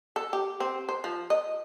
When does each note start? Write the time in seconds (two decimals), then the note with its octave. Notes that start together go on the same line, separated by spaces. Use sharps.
0.16 A4
0.33 G4
0.60 C4
0.89 C5
1.04 F3
1.30 D#5